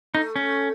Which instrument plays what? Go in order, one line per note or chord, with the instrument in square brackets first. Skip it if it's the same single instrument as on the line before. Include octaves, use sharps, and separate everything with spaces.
[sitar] A3 [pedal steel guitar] D#4
[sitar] A3 [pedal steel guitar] C#4